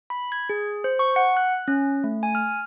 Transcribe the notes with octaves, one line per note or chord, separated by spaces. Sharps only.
B5
G#6
G#4
C5
C#6
F#5
F#6
C#4
A3
G#5
F6